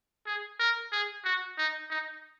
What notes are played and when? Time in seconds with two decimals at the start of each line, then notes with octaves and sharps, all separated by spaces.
0.26 G#4
0.59 A#4
0.92 G#4
1.25 F#4
1.58 D#4
1.90 D#4